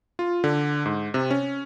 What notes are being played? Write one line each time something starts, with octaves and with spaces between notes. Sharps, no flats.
F4
D3
G#2
C3
C#4